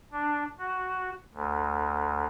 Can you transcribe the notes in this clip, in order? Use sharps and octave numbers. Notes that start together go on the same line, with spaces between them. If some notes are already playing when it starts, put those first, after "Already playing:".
D4
F#4
D2